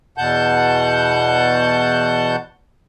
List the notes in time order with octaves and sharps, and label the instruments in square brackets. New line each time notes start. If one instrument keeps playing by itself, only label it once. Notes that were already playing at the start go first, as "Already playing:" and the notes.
[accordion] E2 B2 F#5 A5 G6